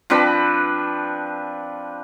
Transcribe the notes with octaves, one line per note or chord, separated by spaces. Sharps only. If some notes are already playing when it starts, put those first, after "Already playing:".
F3 C4 D4 B4